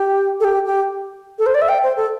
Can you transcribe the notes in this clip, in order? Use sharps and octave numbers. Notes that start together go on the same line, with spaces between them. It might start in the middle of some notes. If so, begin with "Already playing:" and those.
Already playing: G4
A4
G4
G4
A4
C5
D5
E5
G5
C5
A4